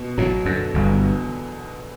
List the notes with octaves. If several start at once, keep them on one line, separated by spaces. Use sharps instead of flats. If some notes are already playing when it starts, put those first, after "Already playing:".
Already playing: B2
A1 A2 F#3
F#2 D3
G1 E2 G2